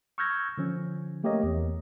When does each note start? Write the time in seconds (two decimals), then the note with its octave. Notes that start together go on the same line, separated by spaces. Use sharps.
0.18 C#6 E6 F6 G6 G#6 A#6
0.58 D3 F3 C#4
1.24 A3 A#3 G4 A#4 C#5 D#5
1.43 E2